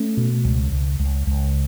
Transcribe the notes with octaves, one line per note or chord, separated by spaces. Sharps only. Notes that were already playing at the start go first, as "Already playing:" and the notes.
Already playing: A3 C#4
B2
C#2
C#2
C#2
C#2